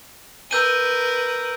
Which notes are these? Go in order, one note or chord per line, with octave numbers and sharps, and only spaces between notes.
A#4 B4 E6 G6 D#7